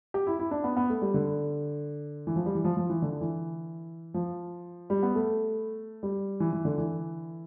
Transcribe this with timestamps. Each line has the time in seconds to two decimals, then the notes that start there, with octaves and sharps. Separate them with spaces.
0.14 G4
0.27 E4
0.39 E4
0.51 D4
0.64 B3
0.77 B3
0.89 A3
1.02 G3
1.14 D3
2.27 E3
2.36 F3
2.46 G3
2.55 E3
2.64 F3
2.77 F3
2.90 E3
3.02 D3
3.21 E3
4.14 F3
4.90 G3
5.03 B3
5.15 A3
6.03 G3
6.40 E3
6.53 E3
6.65 D3
6.78 E3